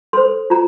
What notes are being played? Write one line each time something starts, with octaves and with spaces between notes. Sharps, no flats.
A4 C5 C6
F4 A#5